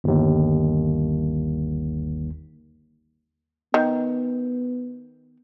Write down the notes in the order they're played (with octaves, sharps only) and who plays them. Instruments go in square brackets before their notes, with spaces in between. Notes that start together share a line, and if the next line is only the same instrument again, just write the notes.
[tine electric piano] G1 D#2
[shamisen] D#3 [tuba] B3